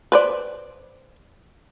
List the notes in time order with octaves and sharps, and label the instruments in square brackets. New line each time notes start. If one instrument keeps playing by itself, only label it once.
[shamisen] B4 C5 D5